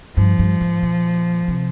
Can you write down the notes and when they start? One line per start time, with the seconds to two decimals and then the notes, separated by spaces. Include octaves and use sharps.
0.16 G2 F3
0.39 G2
0.61 G#2
0.83 A#2
1.48 C3